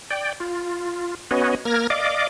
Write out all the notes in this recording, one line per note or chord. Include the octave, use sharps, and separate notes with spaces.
D5 G5
F4
B3 C#4 F#4 B4 C#5 D#5
A#3 A#4 F6 G#6 A#6
D5 D#5 F5 D6